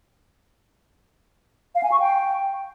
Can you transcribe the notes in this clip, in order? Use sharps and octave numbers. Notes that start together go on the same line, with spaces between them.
F5
G#5
C#6
G5